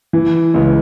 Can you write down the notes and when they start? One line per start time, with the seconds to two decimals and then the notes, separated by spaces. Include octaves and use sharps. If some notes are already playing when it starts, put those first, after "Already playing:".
0.13 E3
0.54 C#2